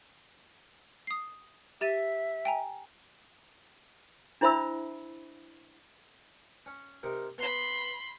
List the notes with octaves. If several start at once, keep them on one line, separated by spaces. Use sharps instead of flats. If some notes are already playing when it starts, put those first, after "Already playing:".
D#6 C7
G4 E5 A6 D#7
G5 G#5 A#5
D4 E4 C5 E5 B5 E6
C#4
C3 D#4 A#4
B3 B5 C6